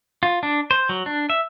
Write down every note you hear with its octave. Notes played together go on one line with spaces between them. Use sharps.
F4
D4
C5
F#3
D4
E5